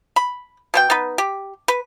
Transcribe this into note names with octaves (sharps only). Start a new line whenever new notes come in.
B5
B2 C4 G5
B3 D#4 B4
G4
B4